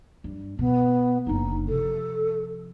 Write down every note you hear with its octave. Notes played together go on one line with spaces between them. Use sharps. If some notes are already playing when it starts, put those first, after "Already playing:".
G2
B2 B3
F#1 D3 D#4
C3 F3 A4